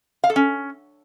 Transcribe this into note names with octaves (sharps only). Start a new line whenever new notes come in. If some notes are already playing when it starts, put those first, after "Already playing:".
F5
A4
C#4